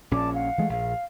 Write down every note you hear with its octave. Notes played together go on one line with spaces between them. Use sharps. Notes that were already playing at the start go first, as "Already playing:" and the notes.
A#1 A#2 C#4 D5 A5 D6
F5 F#5
E3 G#3 A3
A#1 F5